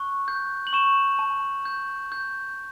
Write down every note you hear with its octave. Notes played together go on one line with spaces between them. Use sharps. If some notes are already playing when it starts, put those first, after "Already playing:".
Already playing: C#6 F#6
G6
F#7
C#6 E7
A5
G6
G6